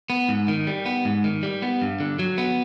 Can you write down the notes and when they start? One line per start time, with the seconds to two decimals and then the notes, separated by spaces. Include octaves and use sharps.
0.10 B3
0.29 G#2
0.48 D#3
0.67 G3
0.86 B3
1.05 G#2
1.24 D#3
1.43 G3
1.62 B3
1.82 G2
2.00 D3
2.19 F#3
2.38 B3